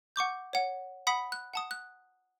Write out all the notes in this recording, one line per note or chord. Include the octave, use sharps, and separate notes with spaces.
F#5 C#6 D6 G6
C#5 F#5
F#5 B5 D#6 B6
F#6
F#5 A5 D#6
F#6